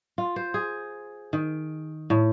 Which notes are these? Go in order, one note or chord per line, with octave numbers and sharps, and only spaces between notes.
F4
C5
G#4
D#3
A2